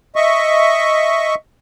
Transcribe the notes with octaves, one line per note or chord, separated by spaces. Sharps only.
D#5 E5 C#6